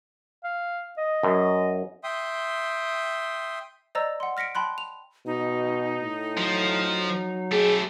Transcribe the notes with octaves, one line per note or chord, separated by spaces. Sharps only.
F5
D#5
F#2
E5 G5 C6 D#6
C5 D5 D#5 A#5 E6
F#5 C6
F6 A#6 B6 C#7 D7
G5 A5 B5 C6 F#6
F7
B2 D#4
A2
F3 F#3
A3 G4 G#4